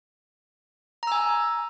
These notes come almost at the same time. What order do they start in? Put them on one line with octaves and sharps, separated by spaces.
A#5 E6 G#5